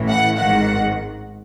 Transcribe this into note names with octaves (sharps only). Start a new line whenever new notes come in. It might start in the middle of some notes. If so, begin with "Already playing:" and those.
Already playing: A1 A2 E3
F#5
G#1 G#2 D#3 F#5